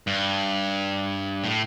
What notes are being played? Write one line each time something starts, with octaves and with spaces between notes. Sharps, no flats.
G2
A2